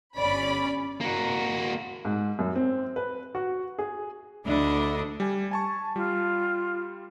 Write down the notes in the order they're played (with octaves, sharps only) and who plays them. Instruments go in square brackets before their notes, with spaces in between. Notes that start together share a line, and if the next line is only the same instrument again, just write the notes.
[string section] G1 C#4 D5 B5
[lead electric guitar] A#3 F#4
[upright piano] G#2
F#2
C4
B4
F#4
G#4
[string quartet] D2 D3 D4 E4 D#5
[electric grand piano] G3 G#5
G#5 A5 C#6
[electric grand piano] G3 [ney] F4